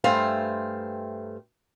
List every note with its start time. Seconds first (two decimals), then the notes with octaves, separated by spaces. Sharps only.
0.04 G2 A3 C5 F5 G5 G#5